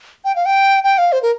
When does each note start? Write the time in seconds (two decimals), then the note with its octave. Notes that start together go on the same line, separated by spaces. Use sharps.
0.25 G5
0.36 F5
0.46 G5
0.84 G5
0.98 F5
1.12 C5
1.23 A#4